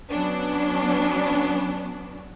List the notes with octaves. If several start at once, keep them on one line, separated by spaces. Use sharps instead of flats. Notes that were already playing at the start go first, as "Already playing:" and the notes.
F#3 B3 C#4 D4